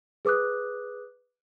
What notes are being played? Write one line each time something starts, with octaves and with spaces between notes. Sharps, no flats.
G#4 B4 D6 D#6 F#6